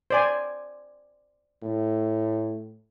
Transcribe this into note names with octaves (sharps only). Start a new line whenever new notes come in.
C5 D5 G#5
A2